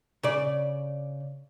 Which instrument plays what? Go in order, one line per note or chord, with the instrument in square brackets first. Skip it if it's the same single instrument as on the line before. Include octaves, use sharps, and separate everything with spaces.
[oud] C#3 D5